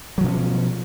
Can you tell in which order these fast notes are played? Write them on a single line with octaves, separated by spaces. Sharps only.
F#3 F3 B2 C#4